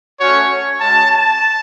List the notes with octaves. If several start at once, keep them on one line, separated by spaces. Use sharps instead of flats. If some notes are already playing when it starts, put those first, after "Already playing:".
A3 C#4 F#4 C#5
G#3 C#4 F#4 A5
A5